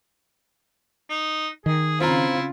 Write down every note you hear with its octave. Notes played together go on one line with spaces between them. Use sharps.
D#4
D#3 G#4
C#3 C4 E4 F4 F5 A#5